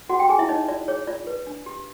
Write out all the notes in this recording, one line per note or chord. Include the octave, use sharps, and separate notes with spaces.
F#4 G#4 F#5
G4 G5
D#4 G#4 G#5
E4 E5
D#4 C#5 D#5
F4 D5
G#4 C#5
F4 D5
B4
D4
G4